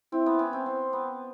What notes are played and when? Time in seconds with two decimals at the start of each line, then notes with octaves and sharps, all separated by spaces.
0.12 C4 E4
0.26 B3
0.39 C#4
0.53 C4
0.66 C4
0.93 B3